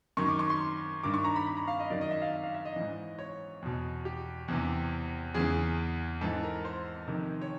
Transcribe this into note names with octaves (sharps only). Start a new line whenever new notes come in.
F#2 D#3 C#6
D6
C#6
C6
G2 D#3 D6
C#6
A#5
B5
B5
A#5
F5
D#5
F#2 D#3 D5
D#5
E5
F5
E5
F5
E5
D#5
G#2 E3
C#5
E2 B2
G4
E2 C3 E3
E2 C#3 E3 G#4
G#2 E3 A4
A#4
C5
F2 C3 D#3
C#5